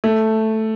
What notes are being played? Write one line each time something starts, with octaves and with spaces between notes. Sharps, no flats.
A3